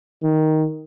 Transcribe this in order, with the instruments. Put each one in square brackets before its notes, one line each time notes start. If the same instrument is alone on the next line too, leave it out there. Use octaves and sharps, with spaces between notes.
[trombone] D#3